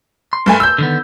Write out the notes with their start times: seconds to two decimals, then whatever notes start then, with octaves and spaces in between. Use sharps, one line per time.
0.33 C6
0.46 G2 A3 G#5
0.60 E6 G6
0.78 D3 D#3 B3